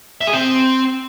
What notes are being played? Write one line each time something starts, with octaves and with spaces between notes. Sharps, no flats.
E5
G#4
C4